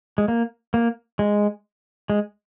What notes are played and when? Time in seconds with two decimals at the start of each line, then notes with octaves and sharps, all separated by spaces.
0.18 G#3
0.28 A#3
0.74 A#3
1.19 G#3
2.10 G#3